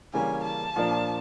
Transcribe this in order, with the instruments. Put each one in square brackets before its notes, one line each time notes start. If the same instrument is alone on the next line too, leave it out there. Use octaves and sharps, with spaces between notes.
[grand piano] C#3 E3 G3 A#3 C#4 [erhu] G#5
[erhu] A5
[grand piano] A#2 F3 A#3 D4